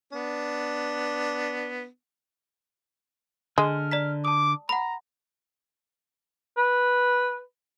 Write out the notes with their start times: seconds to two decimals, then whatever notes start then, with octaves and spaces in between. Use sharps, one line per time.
0.13 B3 D4
3.58 D3 G#3 F6
3.91 D5 A#5 B6
4.25 A5 D6 D#6
4.69 F#5 A#5 B5
6.57 B4